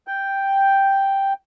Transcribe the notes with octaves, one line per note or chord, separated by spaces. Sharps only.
G5